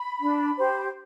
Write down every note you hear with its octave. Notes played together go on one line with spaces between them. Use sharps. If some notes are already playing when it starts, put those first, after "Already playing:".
Already playing: B5
D4
G4 C5